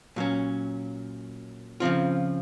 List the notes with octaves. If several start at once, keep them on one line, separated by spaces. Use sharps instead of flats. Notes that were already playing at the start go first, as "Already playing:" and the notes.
A#2 F#3 C#4
C#3 F3 C4 F4